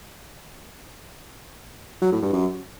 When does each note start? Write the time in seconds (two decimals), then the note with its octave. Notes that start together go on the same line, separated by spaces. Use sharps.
2.02 F#3
2.12 A2
2.22 G2
2.33 F#2